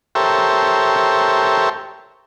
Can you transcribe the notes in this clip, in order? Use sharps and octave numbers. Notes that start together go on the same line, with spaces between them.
G4 A4 A#4 C5 C#5 E5